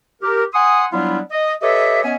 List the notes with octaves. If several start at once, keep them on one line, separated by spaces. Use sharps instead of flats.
G4 A#4
F#5 G#5 C6 D#6
F#3 G3 B3 D4 E4 F4
D#5
G4 A4 B4 C#5 D#5 E5
B3 C#4 C#5 D#5 E5 G#5